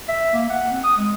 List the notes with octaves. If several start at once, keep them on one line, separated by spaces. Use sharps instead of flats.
E5
A#3
F#5
C4
D#6
G#3